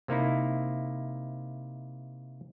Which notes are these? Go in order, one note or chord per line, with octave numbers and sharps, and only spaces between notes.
C3 A#3 D#4 E4